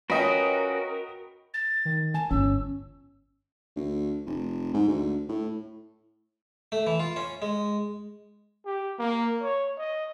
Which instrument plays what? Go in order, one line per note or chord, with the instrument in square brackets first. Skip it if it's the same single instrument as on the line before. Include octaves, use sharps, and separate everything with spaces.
[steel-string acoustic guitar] C#4 F4 [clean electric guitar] F#4 [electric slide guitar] A#4 [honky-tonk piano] B4 D#5 G5
[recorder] A6
[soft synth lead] D#3
[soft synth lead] G#5 [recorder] A5
[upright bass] G1 [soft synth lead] C#4 [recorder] E6
[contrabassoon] D2
F1
G#2
D2
A2
[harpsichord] A3
E3
F4
C#4
G#3
[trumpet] G4
A#3
C#5
D#5